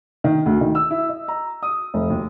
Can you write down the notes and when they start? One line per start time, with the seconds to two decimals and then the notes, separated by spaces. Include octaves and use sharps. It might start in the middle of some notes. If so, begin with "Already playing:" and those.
0.24 D#3
0.46 D2
0.61 D#3
0.75 E6
0.91 E4
1.09 D#5
1.28 A#5
1.63 D#6
1.94 F1
2.10 D#2